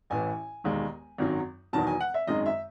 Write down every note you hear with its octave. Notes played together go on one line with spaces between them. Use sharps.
A1 A2 E3 G#5
E1 D#2 D#3 G#3
G#1 F#2 D#3 F#3
E1 E2 D#3 F#3 A5
G#5
F#5
E5
G#1 F#2 D#3 G#3 D#5
E5